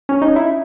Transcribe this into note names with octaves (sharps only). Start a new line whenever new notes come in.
C#4
D#4
E4